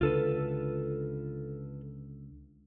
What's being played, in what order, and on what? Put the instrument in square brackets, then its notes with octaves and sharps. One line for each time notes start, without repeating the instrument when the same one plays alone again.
[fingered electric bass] C#2 D3 [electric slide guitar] F4 A4 B4